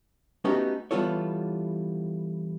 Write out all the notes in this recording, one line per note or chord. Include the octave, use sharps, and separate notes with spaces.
A3 B3 C#4 D#4 F#4 G4
E3 G3 B3 F4 A4 C#5